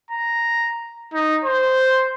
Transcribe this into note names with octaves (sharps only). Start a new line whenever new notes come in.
A#5
D#4
C5